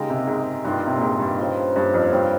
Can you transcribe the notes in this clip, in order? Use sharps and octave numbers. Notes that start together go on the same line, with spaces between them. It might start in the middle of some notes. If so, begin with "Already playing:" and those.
Already playing: C#3 G#3 A#3 D#4 G4 A#4
C3
G#2
G2 D#3 G3 A#3 F4
C3
A#2
G#2
G2
C#3 F3 A#3 F4
G2
F2
G2 C#3 G3 C4 F4